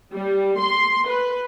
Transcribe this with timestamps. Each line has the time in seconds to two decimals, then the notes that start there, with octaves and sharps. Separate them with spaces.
0.13 G3
0.59 C6
1.08 B4